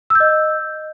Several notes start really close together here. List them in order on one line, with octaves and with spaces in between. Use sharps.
E6 G6 D#5